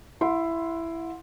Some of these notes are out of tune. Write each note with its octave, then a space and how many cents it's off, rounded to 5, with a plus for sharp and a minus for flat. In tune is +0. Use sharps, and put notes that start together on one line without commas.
E4 +10 F#5 -35 C6 +0